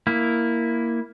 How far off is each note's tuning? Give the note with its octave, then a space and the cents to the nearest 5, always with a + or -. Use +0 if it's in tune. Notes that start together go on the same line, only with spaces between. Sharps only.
A#3 +0 E4 +0